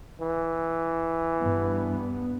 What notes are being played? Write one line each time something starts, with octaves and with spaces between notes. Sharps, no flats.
E3
G2 B3